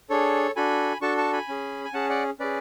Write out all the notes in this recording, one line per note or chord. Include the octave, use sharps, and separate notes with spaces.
D4 G#4 A4 C#5
D4 F#4 A4 G#5 B5
D4 F#4 A4 A5 C#6
A5 C#6
G#5 B5
C#4 G#4
G#5
C#4 G#4 F#5 A5
D5 F#5
C#4 G#4 B4 D5